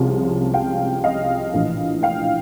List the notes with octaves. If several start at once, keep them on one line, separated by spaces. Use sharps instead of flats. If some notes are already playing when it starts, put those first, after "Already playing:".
Already playing: C2 C3 F3 G#3 C#4
F5 G5
D#5 F5
A#1 A2 E3
F5 G5